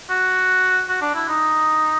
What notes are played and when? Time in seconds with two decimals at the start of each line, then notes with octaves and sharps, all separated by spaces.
0.10 F#4
0.88 F#4
1.01 D4
1.15 E4
1.28 D#4